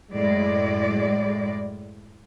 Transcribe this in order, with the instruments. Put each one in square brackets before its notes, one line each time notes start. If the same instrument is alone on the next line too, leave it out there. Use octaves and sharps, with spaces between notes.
[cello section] F#2 A2 G#3 D5